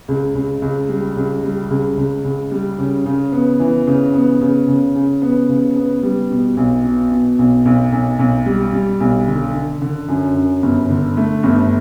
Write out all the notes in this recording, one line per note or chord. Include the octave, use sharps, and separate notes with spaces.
C#2
C#2
C#2
G3
C#2
G3
C#2
C#2
C#2
G3
C#3
C#3
B3
E3
C#3
B3
C#3
C#3
C#3
B3
C#3
B3
G3
B2
B1
B2
B2
B1
B1
B1
B1
G3
G3
B1
D3
D3
D3
F#2
F#2
G1
D3
A3
G1